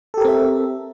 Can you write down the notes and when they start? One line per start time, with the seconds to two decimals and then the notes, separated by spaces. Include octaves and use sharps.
0.14 A4
0.17 G4
0.21 A#4
0.25 C4
0.28 E5